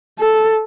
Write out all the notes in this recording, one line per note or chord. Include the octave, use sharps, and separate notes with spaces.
A4